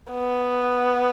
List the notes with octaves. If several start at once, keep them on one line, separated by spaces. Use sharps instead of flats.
B3